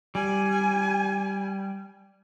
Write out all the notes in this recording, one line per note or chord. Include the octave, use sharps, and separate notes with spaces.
G3 G#5